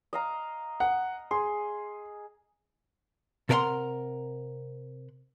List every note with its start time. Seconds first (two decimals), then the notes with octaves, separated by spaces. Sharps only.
0.13 D#5 F5 A#5
0.80 F#5
1.31 G#4 C6
3.49 C3 A4 A#4 E5 F#5 C6